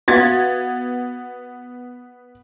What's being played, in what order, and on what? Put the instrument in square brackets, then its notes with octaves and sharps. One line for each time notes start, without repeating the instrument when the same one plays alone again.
[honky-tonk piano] B3 G#6 A6 [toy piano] F#4 E5 F5